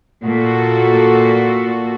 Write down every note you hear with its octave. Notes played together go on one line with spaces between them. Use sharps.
A#2 F#4 A4